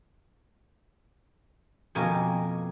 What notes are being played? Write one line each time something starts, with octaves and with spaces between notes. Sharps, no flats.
F2 B2 A#3 G#5